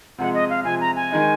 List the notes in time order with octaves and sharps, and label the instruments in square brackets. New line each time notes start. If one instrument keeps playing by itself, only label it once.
[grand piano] C3 F3 G#3 [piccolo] F#5
[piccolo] D#5
F5
[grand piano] C3 F3 G#3 [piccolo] G#5
[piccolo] A#5
G#5
[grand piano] D#3 G#3 D#4